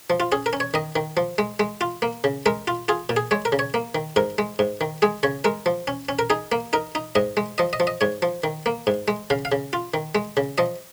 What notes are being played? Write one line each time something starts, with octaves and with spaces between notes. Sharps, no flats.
F3
F4
C#4 G#4
A#4
C#4
C#5
D#3 D#5
D#3
F3
G#3
G#3
F4
A#3
C#3
G#3 A#4
F4
F4 G#4
A#2
G#4
G#3 C#5
A#4
C#3
C#5
A#3
D#3
G#2 A#4
G#3
G#2
D#3
G#3 G#4
C#3 C#5
G#3 A#4
F3
C#4
C#4
A#4
D#4 G#4
A#3
D#4 A#4
D#4
G#2 D#5
G#3
F3 D#5
D#5
F3
D#5
G#2 C#5
F3
D#3
A#3
G#2
G#3
C#3 F5
F5
C#3
F4
D#3
G#3
C#3
F3 D#5